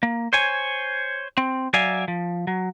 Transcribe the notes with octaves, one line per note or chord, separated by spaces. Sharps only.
A#3
C5 C#5 G#5
C4
F#3 D5 E5 F5 G#5
F3
F#3